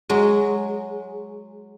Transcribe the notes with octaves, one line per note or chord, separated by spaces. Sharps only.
F#3 G#3